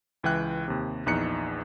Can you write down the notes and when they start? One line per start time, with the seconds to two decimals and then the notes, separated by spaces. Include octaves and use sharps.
0.23 C#2 E3 E5 G5 F#6
0.68 D#2 C3
1.06 A#1 E2 D#4 F#6 C#7